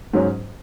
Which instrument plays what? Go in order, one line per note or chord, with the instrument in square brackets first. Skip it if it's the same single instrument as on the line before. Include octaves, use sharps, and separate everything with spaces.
[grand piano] G#2 F#3 C#4